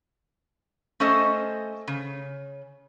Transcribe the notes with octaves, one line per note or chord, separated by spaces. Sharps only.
A3 C#4 A4 C5 D#5
C#3